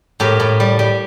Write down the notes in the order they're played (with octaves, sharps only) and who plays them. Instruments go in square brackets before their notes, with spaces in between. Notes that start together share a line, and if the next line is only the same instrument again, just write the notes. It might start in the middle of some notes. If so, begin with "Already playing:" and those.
[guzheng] A2 G4 A#4
A2
G3
G3